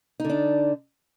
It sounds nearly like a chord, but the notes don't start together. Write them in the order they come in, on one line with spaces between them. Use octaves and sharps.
D#4 D3 D4